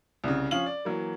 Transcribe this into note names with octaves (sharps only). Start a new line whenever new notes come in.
C2 C#3
F3 C#4 F5 F#7
D5
E3 F#3 A#3